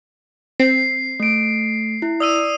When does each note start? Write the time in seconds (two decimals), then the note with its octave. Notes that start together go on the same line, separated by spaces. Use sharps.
0.60 C4 C7
1.20 A3 D7
2.02 E4
2.20 D5 D#6 E6 D#7